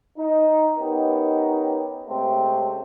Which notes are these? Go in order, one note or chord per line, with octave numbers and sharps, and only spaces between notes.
D#4
B3 C#4 D#4 G4 A#4
C3 G#3 A3 C4 C#4